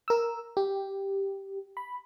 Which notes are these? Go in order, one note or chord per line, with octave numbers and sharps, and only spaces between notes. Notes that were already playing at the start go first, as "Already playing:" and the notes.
A#4 E6
G4
B5